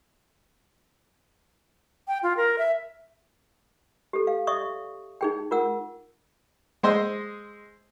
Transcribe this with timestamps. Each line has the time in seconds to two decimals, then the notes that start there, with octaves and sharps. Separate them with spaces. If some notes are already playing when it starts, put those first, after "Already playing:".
2.08 G5
2.23 F4
2.37 A#4
2.58 E5
4.13 G4 A4
4.27 F5
4.47 D5 E5 C#6 D#6
5.21 D#4 G#4 G5
5.51 F4 A#4 F#5 E6
6.83 G#3 C5 D#5 C6 E6